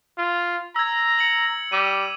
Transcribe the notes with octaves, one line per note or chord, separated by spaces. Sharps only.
F4
A#5 E6 G#6
C#7 F#7
G3 D6 D#7